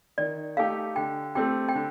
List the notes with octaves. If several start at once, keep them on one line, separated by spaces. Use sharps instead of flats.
D#3 D5
A3 D#4 G4 F5
D3 G5
A3 C4 G4 G5
G5
D3